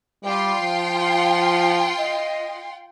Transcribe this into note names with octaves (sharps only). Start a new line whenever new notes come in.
G3 F4 G5 C6
F3
D#5